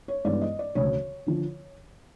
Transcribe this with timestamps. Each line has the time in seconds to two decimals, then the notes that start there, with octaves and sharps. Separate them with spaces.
0.08 C#5
0.25 G2 E3 G#3 B3 D5
0.41 D#5
0.59 D5
0.75 E1 D2 C#3 F#3 C#5
1.27 D3 F3